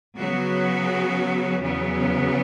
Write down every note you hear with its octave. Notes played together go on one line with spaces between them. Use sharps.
C#3 F#3 B3 F#4
E2 C#3 F#3 B3